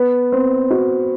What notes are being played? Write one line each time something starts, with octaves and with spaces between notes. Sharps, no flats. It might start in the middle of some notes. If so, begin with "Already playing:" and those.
Already playing: B3
C4
F#4